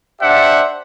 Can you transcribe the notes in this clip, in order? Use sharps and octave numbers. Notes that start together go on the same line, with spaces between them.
D4 G4 C5 D5 E5 F#5